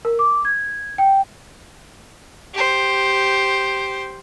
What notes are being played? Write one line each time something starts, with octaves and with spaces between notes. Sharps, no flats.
A#4
D6
G#6
G5
G4 C5